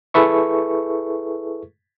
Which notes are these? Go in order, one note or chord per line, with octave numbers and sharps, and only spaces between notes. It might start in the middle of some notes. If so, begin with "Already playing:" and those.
E4 G#4 A4 B4 E5 C#6